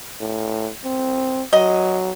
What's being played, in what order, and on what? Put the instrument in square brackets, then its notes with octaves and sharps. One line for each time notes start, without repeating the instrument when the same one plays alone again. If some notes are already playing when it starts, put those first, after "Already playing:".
[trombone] A2
C4
[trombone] F#3 [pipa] D#5